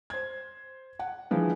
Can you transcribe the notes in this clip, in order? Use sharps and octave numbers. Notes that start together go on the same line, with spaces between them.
C5 G#6
F#5
D3 E3 F3 G#3